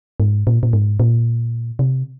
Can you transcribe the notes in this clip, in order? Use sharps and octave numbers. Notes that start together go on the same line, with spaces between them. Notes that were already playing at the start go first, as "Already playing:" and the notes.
G#2
A#2
A#2
G#2
A#2
C3